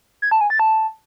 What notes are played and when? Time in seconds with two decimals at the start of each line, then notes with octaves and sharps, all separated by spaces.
0.22 G#6
0.31 A5
0.41 G#5
0.50 A6
0.59 A5